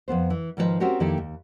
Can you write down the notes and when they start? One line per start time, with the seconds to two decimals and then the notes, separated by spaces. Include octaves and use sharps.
0.08 F2 G#2 B3 C5
0.30 E3
0.57 G#2 D#3 F3 F4 B4 D#5
0.80 C4 C#4 F#4 G4 A#4
1.00 F2 D#3 A#3 E4 G4 A4
1.18 D#2